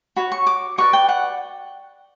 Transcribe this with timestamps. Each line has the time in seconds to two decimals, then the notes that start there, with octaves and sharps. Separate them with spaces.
0.16 F#4 C#5 B5
0.32 C#6
0.47 D6
0.78 F#4 B4 D5 C#6
0.93 G5
1.09 F#5